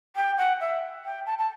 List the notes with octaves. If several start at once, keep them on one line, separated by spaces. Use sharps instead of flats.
G5
F#5
E5
G5
A5
A5